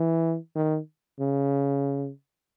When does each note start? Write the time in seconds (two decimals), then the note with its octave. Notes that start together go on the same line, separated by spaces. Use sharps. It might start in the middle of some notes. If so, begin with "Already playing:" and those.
Already playing: E3
0.55 D#3
1.20 C#3